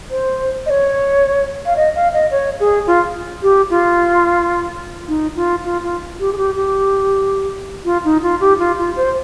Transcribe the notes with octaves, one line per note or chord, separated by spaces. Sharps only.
C5
D#5
C#5
F5
D#5
F5
D#5
C#5
G#4
F4
G4
F4
D#4
F4
F4
F4
G4
G#4
G4
G4
F4
D#4
F4
G4
F4
F4
C5